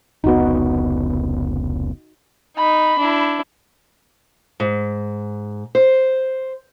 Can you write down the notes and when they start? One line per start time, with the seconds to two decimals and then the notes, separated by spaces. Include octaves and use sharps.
0.24 F1 C#2 B3 D#4 F#4
2.57 D#4 B5
2.99 D4 E4
4.60 G#2
5.75 C5